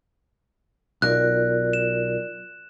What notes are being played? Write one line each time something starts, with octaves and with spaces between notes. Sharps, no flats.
B1 F4 A#4 D5 F#6
E7